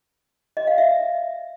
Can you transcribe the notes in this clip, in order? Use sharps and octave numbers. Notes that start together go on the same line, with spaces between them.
D#5
F5
E5